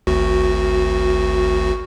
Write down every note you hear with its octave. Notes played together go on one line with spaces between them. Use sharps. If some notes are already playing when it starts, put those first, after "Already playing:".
G#1 D2 F#4